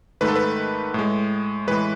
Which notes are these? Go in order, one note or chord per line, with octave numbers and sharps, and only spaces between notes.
G#2 D#3 A3 B4
A4
B4
A2 G#3
A2 E3 G#3 B4